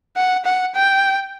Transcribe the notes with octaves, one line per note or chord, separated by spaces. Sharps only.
F#5
F#5
G5